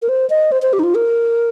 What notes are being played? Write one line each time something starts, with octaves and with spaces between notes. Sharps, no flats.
A#4
C5
D#5
C5
C5
G4
D#4
F4
A#4